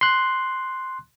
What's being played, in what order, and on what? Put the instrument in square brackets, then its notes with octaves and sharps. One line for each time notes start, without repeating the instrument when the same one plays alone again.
[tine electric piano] C6 F#6